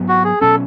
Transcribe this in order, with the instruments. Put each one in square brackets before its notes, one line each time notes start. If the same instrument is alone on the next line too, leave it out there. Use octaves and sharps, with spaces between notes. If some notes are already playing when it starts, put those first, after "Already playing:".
Already playing: [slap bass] G#2 F#3 B3
[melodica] F#4
G#4
[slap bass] B2 F#3 C#4 [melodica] A4